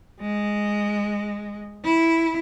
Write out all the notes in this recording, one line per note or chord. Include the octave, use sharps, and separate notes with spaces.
G#3
E4